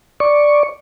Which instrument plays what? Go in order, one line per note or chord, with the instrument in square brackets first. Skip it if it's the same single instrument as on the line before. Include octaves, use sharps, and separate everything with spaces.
[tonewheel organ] D5 C#6